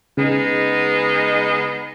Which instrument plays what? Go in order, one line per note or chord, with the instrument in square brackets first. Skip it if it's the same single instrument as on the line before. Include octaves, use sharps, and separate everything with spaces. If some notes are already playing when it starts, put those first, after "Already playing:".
[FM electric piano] C#3 [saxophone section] G#3 B3 D#4